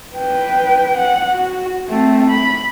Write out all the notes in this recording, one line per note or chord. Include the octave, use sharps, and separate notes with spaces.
B4 G5
F#5
F#4
A3 C4
B5